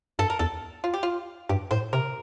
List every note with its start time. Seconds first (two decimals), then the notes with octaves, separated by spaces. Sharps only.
0.19 G2 A4
0.30 A#4
0.39 E2 A4
0.84 F4
0.94 G4
1.03 F4
1.49 G2 G4
1.71 A2 C5
1.93 C3 A#4